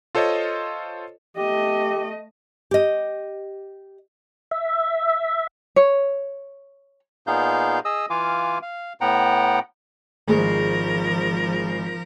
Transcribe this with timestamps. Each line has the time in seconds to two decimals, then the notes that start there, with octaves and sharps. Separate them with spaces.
0.15 F4 A4 C5 C#5 D#5
1.37 A3 G4 D#5
2.71 G4 D#5
4.51 E5
5.76 C#5
7.27 A#2 B3 D#4 G#4 F5 G6
7.85 G#4 D#5 D#6 E6
8.10 E3 F4 F5 G#5 D6
8.62 F5
9.01 A2 B3 F#5 G5 A#5
10.28 G#1 F3 G#3 A#4